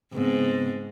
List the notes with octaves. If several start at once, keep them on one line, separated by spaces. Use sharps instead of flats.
G#2 C#3 B3 C4